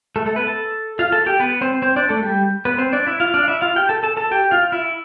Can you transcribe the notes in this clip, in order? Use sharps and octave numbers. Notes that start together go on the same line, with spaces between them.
A3 A4
A3 A4
B3 B4
A4 A5
F4 F5
A4 A5
G4 G5
B3 B4
C4 C5
C4 C5
D4 D5
A3 A4
G3 G4
B3 B4
C4 C5
D4 D5
E4 E5
F4 F5
D4 D5
F5
E4 E5
F4 F5
G4 G5
A4 A5
A4 A5
A4 A5
G4 G5
F4 F5
E4 E5